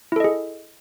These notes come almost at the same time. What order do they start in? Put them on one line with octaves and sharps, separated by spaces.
E4 A4 D#5 G#4